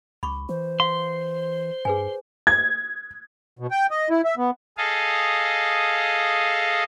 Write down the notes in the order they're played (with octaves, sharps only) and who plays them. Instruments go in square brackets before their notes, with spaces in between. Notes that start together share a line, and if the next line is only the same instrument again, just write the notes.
[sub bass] C#2 [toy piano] B5 C#6 D6
[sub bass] E3 [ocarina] C5
[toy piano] F5 [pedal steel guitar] C6
[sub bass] G2 [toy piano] G#4 B4 G#5
[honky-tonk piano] G#6
[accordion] B2
G5
D#5
E4
E5
B3
[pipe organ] G#4 A4 D#5 F5